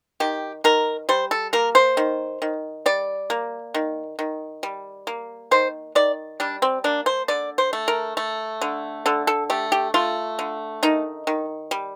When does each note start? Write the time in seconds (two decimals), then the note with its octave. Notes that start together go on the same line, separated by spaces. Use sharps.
0.20 D#3 G4
0.64 D#3 A#4
1.09 G3 C5
1.31 A4
1.53 A#3 A#4
1.75 C5
1.97 D#3
2.42 D#3
2.86 G3 D5
3.30 A#3
3.74 D#3
4.19 D#3
4.63 G3
5.07 A#3
5.51 D#3 C5
5.95 D#3 D5
6.40 G3 D4
6.62 C4
6.84 A#3 D4
7.06 C5
7.28 D3 D5
7.58 C5
7.73 A3
7.88 A#4
8.17 A3
8.61 D3
9.06 D3 A4
9.27 A4
9.50 A3 G4
9.72 G4
9.94 A3 F4
10.39 D3
10.83 D#3 D#4
11.27 D#3
11.71 G3